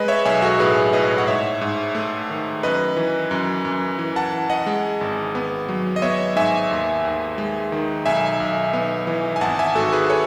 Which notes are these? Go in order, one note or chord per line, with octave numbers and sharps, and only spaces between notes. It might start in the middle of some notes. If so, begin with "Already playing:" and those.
Already playing: G#3 B4 D#5
C#5 E5
B1 E5 G#5
F#4 A4
A2 G#4 B4
A2 B4 D#5
F#5
G#2 C#5 E5
G#2
A3
D#3
F#2 B4 D#5
E3
F#2
F#2
E3
F#5 A5
E3
D#5 F#5
G#3
G#1
B3
F#3
D#5
B3 C#5 E5
G#2 E5 G#5
D#2
D#2
G#3
D#3
B1 E5 G#5
B1
B3
E3
G#5
G#1 F#5 A5
E5 G#5
G#2 F#4 A4
G#4 B4
A4 C#5